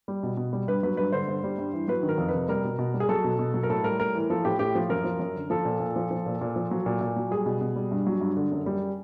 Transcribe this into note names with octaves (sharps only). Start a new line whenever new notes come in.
G3
B2
B2
G3
G2 B4
F#3 B4
G2 B4
D3 C5
G2
G3
G2
E3
F#3 B4
D#3
A#4
F2
B4
C3
G3 A#4
B2
B2
G3
G#4
F#3 A4
B2
B2
F#3
A#4
A2 A4
G3 A#4
A2 A#4
E3
F3 A4
A2 G4
A2 G4
F3
F#2 A#4
F3
F#2
D3
F3 A4
A#2
A#2
F3
F3
A#2
A#2
F3
F#3
A#2
A#2
F#3
G3 G#4
B2
B2
G3
G2
F#3
G2
D3
F#2
G3